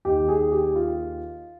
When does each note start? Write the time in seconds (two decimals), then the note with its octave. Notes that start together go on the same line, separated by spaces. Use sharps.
0.05 D#2 D#3 G4
0.28 G#4
0.52 G4
0.76 F4